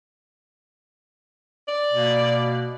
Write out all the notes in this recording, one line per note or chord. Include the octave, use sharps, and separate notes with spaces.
D5
B2 A#3